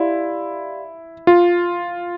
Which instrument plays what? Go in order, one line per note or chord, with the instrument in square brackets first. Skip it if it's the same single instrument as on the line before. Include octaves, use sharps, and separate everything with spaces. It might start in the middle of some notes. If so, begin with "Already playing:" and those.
Already playing: [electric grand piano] E4 [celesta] G4 D5 F5 C6
[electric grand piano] F4